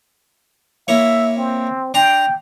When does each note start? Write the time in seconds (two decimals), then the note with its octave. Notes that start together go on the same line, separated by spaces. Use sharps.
0.88 A#3 E4 C#5 E5
1.37 C4
1.94 D4 G5 A#5 C6